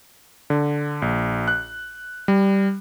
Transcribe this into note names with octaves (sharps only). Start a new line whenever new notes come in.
D3
A#1
F#6
G3